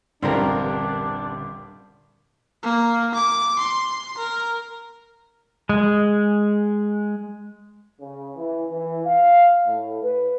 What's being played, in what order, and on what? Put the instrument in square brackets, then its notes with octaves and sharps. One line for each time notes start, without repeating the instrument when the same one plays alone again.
[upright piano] D#1 A1 [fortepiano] G2 F4 [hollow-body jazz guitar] D3 C4 A#4 [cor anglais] D4
[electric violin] A#3
D6
C6
A#4
[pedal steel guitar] G#3
[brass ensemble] C#3
E3
E3
F5
A2
B4